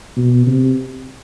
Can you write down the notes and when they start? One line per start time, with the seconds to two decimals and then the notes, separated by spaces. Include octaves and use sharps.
0.16 B2
0.47 C3